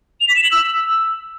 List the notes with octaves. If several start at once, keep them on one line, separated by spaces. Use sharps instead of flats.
F7
B6
E7
F#7
E6